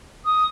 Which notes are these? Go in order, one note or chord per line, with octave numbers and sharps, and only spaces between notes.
D#6